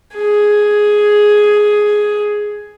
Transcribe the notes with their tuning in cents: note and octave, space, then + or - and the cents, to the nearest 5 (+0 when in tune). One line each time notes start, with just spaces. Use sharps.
G#4 +5